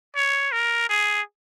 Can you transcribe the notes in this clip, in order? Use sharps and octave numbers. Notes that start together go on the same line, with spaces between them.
C#5
A#4
G#4